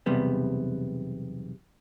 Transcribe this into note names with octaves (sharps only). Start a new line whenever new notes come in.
B1 E2 C3 G3 B3